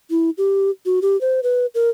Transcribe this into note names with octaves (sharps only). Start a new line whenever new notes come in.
E4
G4
F#4
G4
C5
B4
A#4